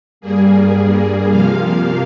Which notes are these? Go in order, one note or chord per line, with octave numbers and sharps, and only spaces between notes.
G2 G3 A#3 G#4
C3 F3 A#3 F5